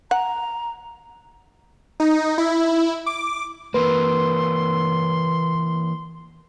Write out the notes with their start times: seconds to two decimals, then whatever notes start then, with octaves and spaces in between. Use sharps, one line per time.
0.11 F#5 A#5
2.00 D#4
2.38 E4
3.06 D6
3.74 E3 A#3 B4 C6